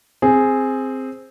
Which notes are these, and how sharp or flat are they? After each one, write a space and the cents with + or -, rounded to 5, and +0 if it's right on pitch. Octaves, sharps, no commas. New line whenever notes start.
C4 +0 G#4 +0